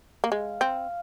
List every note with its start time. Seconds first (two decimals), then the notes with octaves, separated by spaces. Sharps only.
0.24 A#3
0.32 G#3 F5
0.61 C4